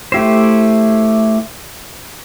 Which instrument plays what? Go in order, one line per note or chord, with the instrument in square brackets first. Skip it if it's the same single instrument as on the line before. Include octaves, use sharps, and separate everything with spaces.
[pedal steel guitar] A3 E4 G4 C5